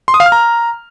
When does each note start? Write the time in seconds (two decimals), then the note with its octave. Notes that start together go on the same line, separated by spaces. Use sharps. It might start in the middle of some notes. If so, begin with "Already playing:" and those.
0.08 C6
0.14 D#6
0.20 F5
0.26 F6
0.32 A#5